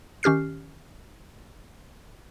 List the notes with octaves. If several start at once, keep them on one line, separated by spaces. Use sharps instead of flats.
D#3 C#4 G4 F6 C7